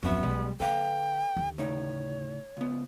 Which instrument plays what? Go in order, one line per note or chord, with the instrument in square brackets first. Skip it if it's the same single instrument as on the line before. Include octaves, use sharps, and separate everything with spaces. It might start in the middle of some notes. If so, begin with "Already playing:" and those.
[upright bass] D1 F2 [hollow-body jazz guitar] F#3 C#4 E5 [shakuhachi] B3
[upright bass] B1 C#4 [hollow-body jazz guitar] G3 G#3
[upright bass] D3 [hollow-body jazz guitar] A4 B4 F5 [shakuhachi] G5
[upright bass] D#2 D3
[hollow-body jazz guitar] A2 C#3 D#4 [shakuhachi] C#5
[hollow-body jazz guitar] C#2 B3